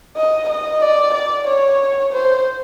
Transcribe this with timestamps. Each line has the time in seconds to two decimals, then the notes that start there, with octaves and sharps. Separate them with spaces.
0.17 D#5
0.49 D#5
0.82 D5
1.14 D5
1.47 C#5
2.13 C5